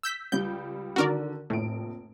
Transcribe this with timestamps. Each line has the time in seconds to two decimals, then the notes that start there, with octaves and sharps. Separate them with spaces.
0.03 E6 G6 B6
0.32 C#2 G3 G6
0.96 D3 D#3 F#4 A#4 D5
1.50 F1 A#1 A2 D7